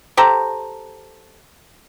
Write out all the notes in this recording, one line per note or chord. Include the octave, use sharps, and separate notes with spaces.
G4 A4 C5 A#5